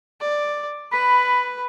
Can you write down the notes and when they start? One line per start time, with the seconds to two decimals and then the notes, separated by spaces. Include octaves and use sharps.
0.21 D5
0.92 B4 B5